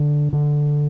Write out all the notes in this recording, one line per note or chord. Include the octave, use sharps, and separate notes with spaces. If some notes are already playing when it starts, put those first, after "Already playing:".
Already playing: D3
D3